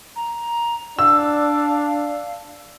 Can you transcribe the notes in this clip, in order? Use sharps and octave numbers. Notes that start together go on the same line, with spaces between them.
A#5
D4 F5 E6